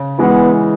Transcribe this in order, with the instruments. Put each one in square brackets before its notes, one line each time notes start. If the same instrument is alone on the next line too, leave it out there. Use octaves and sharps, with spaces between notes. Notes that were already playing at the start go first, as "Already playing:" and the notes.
Already playing: [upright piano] C#3
[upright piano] E3 G#3 [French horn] B3